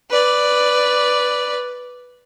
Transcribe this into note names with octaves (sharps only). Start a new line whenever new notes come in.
B4 D5